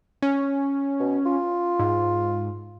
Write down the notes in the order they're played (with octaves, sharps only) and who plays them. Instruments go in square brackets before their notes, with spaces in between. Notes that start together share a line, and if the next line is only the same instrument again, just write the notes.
[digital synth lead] C#4
[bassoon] B2
F4
[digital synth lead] G#2